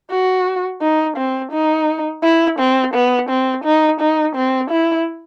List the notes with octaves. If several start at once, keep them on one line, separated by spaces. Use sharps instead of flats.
F#4
D#4
C4
D#4
E4
C4
B3
C4
D#4
D#4
C4
E4